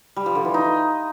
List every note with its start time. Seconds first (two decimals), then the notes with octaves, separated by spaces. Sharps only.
0.16 G3
0.26 F3
0.35 D3
0.45 E3
0.54 D#4